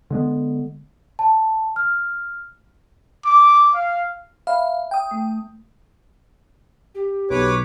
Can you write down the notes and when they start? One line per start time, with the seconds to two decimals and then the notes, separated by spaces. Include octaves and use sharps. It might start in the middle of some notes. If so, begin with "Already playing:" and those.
0.10 D3 G#3 B3
1.19 A5
1.76 F6
3.25 D6
3.75 F5
4.47 E5 F5 B5
4.91 G5 D#6
5.11 A3
6.95 G4
7.30 B1 B4 C#5 D6